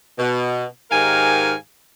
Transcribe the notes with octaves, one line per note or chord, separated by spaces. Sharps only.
B2
G#2 D#3 G4 A#4 F5 G#5